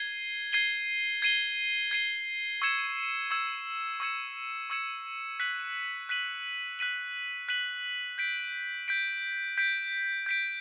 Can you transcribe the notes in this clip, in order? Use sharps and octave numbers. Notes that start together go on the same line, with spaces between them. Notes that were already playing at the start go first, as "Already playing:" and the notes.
Already playing: G#6 C7 D#7 G7
G#6 C7 D#7 G7
G#6 C7 D#7 G7
G#6 C7 D#7 G7
C#6 E6 G#6 C#7 E7
C#6 E6 G#6 C#7 E7
C#6 E6 G#6 C#7 E7
C#6 E6 G#6 C#7 E7
F#6 B6 D#7 F#7
F#6 B6 D#7 F#7
F#6 B6 D#7 F#7
F#6 B6 D#7 F#7
G6 B6 D7
G6 B6 D7
G6 B6 D7
G6 B6 D7